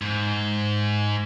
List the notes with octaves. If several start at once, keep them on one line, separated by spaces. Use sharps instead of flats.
G#2